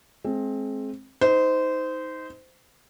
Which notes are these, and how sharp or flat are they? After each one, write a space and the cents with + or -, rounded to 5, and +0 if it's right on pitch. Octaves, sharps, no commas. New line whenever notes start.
G#3 +35 C4 +20
D#4 +25 C5 -20